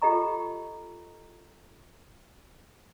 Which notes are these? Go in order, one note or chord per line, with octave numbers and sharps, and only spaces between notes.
F4 G4 A4 D#5 A#5 C#6